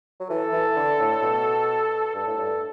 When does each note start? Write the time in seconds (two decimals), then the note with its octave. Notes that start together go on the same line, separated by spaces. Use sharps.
0.20 F#3
0.30 E3 A4
0.53 E3
0.76 D3
0.99 A2
1.22 B2
2.15 G2 A4
2.27 A2
2.38 G2